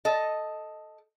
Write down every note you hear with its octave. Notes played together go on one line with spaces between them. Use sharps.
A4 D#5